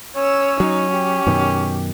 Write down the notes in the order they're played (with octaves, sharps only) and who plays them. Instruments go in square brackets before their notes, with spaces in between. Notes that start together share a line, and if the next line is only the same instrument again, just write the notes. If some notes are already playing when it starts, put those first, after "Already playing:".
[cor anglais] C#4 [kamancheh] C#5 E6
[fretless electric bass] F#3 [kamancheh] D#4
[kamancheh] G4
[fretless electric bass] F#2 B2 D#3